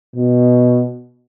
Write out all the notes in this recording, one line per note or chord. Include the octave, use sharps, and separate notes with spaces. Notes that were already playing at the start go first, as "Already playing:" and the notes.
B2